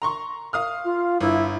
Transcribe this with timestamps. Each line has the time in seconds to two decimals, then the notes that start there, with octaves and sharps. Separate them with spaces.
0.02 A#5 C6 C#6
0.53 F5 D#6 F6
0.85 F4
1.21 G1 E4